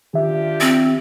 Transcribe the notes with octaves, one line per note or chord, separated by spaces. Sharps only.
D#3 D4 F4 G4 E5
C4